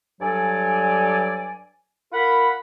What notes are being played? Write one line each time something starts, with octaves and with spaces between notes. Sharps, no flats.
G2 F#3 A4 D5 G#5
F4 A#4 F#5 B5